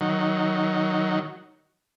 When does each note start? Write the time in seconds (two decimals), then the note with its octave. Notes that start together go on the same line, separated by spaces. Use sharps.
0.01 D#3 F#3